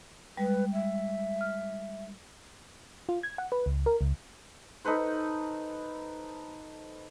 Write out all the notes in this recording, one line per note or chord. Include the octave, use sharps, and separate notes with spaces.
G3 G#3 B4
E5
F6
F4
G#6
F#5
B4
C#2
A#4
C#2
D#4 A4 B4 C5